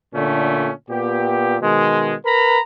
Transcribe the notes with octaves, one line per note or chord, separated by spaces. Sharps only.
A#2 D3 A3 C#4
A#2 B3 G4
B2 D#3 G#3
A#4 B4 A#5 B5